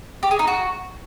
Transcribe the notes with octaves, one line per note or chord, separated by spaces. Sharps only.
G4
G#4
D#4
F#4